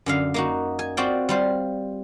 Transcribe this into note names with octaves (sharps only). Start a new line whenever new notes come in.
F#2 D3 F5
A#3 D#4 F#4
G#5
C4 F4 F#4 D5 G5
G3 F4 C5